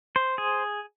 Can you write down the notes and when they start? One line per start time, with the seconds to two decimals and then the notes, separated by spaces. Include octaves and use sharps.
0.16 C5
0.38 G#4